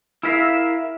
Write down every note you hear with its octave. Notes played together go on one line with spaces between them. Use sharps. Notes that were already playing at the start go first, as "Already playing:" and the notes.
E4 G#4 A#4 E5 F5